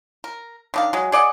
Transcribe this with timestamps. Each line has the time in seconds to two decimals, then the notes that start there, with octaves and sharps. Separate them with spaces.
0.24 A#4
0.74 D#3 D4 F5
0.93 F#3 G#3
1.12 G#4 D5 D#5 F#5